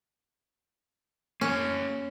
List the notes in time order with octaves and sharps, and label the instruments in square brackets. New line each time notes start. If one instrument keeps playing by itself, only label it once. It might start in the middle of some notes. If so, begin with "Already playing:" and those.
[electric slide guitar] A#3 C#5 [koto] C#4